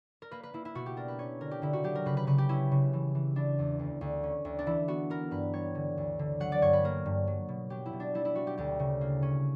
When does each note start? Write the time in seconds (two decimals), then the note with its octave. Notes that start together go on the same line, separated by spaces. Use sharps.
0.22 A#4
0.31 A#3 B4
0.43 B4
0.53 A#3 E4
0.65 E4
0.75 B2 F#4
0.86 G4
0.97 D4 A#4
1.08 B4
1.19 C#4 C#5
1.40 D3 A#4
1.51 G4
1.62 D3 E4
1.73 F#4
1.84 F#3 G4
1.95 A#4
2.06 C#3 B4
2.17 B4
2.27 C#3 B4
2.38 G4
2.49 C#4 E4
2.71 C#3
2.93 E3
3.15 E3
3.36 E3 D4
3.59 E2
3.79 D2
4.01 D2
4.23 C#4
4.45 D2
4.59 D4
4.66 E3 E4
4.88 B3 F#4
5.10 B3 A#4
5.31 G2 B4
5.53 G3 C#5
5.75 D3
5.97 D2
6.19 D3
6.40 F#3 F#5
6.52 D5
6.62 G2 C#5
6.73 B4
6.84 A#3 A#4
7.06 G2
7.27 F#3
7.49 B2
7.70 F#3 G4
7.86 E4
7.93 B2
8.00 D4
8.14 G3 E4
8.25 E4
8.35 G3 F#4
8.47 G4
8.58 D2 G4
8.79 C#3
9.01 A#3
9.22 C#4